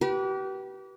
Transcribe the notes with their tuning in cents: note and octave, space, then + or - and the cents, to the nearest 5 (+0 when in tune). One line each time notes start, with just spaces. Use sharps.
G4 -35 B4 -25